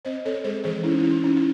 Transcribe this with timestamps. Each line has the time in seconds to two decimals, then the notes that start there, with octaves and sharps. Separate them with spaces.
0.05 C4 C5 D#5
0.25 C4 A4 C#5
0.44 G#3 G#4 C5
0.64 E3 G#4 C5
0.83 C#4 E4
0.91 D#4
0.99 E4
1.04 C#4
1.10 D#4
1.24 C#4
1.36 E4